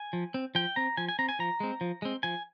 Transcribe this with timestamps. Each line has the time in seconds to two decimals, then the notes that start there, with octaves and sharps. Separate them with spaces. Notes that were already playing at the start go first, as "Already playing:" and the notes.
Already playing: G#5
0.13 F3
0.34 C4
0.55 F3 G5
0.76 C4 A#5
0.97 F3 G#5
1.09 G#5
1.19 C4 A#5
1.29 G#5
1.39 F3 A#5
1.60 G#3 C4
1.81 F3
2.02 G#3 C4
2.23 F3 G#5